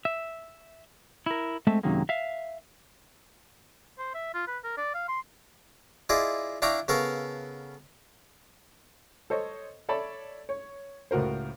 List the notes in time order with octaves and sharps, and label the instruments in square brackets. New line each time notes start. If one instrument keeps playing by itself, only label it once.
[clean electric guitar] E5
E4 A#4
G#3 A3 C4 E5 A5
F#2 C3 D#3 F#3 G#3 A#3
E5 F5
[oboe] C5
E5
F4
B4
A#4
D5
F5
C6
[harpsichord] E4 F4 G#4 D5 D#5
D4 E4 F5 G5 A#5 C#6
C#3 B3 A4 A#4 F5 C#6
[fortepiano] A4 C5 C#5 D#5
A4 C#5 D5 E5 A5 B5
C#5
C#2 A2 F#4 A#4 C5